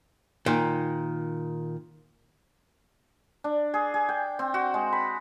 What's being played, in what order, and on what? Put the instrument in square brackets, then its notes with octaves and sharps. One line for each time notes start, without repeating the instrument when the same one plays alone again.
[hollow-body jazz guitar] A#2 D#3
[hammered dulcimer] D4
G#4
G#4
G5
C4
F#4
G#3
B5